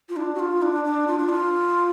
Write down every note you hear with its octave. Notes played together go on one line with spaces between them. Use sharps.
F4
D4
F#4
F4
D4
D4
F4
D4
F4